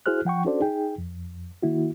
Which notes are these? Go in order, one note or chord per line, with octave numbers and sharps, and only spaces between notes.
E4 F#4 G#4 C5 F6 F#6
F3 F#5 G5 C#6
C#4 D4 F#4 A4 C5 D5
D#4 G#4 G5
F2
D#3 A#3 E4 F#4